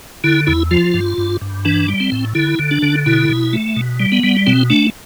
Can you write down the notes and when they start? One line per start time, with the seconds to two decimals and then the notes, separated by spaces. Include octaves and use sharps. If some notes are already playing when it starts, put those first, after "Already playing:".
0.24 D3 E4
0.47 E2 E4
0.71 F3 F4
0.94 G2
1.18 G2
1.41 G2
1.65 E3 D4
1.88 G3
2.00 C4
2.12 A2
2.35 D3 E4
2.59 D3
2.71 D4
2.82 D3
3.06 B2 E4
3.29 B2
3.53 A3
3.76 B2
4.00 G3
4.12 B3
4.23 G3
4.47 B2 C4
4.70 A3 D4